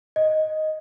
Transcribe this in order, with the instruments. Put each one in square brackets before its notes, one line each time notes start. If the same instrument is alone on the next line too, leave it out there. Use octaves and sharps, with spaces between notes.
[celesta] D#5